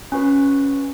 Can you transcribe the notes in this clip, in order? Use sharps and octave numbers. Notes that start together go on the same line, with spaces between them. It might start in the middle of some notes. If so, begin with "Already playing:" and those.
C#4 F#4 B4